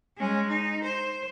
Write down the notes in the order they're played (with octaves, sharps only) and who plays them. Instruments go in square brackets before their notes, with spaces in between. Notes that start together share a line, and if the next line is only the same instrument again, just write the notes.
[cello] G#3 C#4
D#4
C5